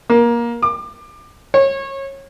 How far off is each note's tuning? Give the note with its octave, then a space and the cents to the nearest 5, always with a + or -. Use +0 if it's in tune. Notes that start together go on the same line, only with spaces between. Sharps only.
A#3 +20
D6 +30
C#5 -25